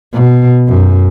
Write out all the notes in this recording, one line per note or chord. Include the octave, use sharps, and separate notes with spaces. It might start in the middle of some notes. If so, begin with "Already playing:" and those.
B2
F#2